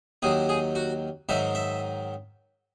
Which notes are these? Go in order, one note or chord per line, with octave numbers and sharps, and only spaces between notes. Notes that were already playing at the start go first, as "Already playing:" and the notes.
D#2 D#3 F#3 G#4
G#4
F#4
G#2 D#3 F#3 E5
E5